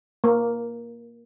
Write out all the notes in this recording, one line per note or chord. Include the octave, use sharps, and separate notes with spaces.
A#3